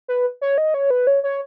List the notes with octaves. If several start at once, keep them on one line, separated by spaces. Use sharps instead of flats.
B4
C#5
D#5
C#5
B4
C#5
C#5